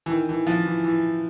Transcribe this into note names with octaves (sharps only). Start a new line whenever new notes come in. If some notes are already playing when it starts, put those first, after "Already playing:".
E3
D#3
E3
F3
E3
E3